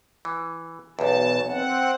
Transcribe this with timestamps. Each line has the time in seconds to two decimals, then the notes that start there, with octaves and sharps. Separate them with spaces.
0.25 E3
0.99 B1 E2 B2 A5
1.48 C4 F#5